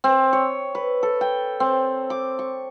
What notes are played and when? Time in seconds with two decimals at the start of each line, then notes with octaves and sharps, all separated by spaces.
0.04 C4
0.33 C#5
0.75 B4
1.03 A4
1.21 G5
1.60 C4
2.10 D6
2.39 C#6